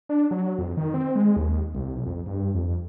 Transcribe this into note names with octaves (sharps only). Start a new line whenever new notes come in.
D4
F#3
F2
D#3
C4
G#3
D#2
C2
B1
F2
G2
F2